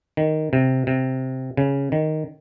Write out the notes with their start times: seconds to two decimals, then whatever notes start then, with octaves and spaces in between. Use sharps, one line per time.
0.17 D#3
0.53 C3
0.87 C3
1.57 C#3
1.92 D#3